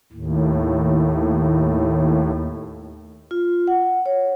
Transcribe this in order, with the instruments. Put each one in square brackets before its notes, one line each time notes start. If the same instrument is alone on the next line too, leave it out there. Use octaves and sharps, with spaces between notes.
[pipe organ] D#2 A2
[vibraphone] F4
F#5
C#5